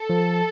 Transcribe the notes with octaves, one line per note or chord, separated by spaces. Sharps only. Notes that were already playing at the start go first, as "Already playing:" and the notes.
Already playing: A4
F3